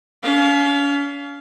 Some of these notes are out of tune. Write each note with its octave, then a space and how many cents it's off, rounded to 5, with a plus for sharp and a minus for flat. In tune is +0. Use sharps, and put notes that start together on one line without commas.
C#4 +40 F5 +0